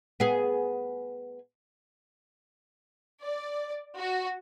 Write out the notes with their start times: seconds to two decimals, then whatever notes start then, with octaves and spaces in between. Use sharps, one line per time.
0.20 B3 G#4
3.22 D5
3.97 F#4